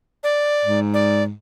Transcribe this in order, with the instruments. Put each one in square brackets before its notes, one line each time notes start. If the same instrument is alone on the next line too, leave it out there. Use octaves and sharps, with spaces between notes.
[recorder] D5
[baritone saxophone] G#2
[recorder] D5